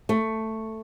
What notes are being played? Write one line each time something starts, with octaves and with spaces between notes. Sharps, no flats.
A3